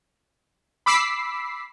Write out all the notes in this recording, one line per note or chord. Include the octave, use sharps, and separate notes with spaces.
B5 D6 E6 B6 C7